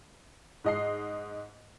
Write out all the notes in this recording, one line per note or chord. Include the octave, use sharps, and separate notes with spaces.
G#2 D#5 C7